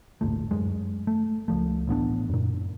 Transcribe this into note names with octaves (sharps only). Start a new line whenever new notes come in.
D1 G1 A#2 A3
F#2 G#3
A3
C#2 F3 A3
A1 A2 B3 D4
F#2 A#2